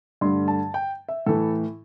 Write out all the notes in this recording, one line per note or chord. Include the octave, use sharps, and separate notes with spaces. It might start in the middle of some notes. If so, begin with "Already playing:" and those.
G2 D3 A3 C6
A5
G5
E5
A2 E3 A3 A4